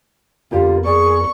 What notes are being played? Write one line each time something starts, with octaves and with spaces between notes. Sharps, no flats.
F2 D3 B3 F4 G4 A#4
G#4 D5 C#6